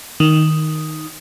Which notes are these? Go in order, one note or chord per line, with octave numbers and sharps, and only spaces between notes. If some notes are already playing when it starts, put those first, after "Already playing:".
D#3